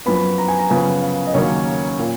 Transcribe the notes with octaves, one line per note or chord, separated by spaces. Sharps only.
F#2 F3 B3 B5
A#5
G#5
A#5
F#2 C#3 F3 B3 G#5
F5
D#5
D#2 C#3 F#3 A#3 C#4 C#5
A#2